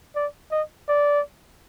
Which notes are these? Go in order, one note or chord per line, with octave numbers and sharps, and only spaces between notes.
D5
D#5
D5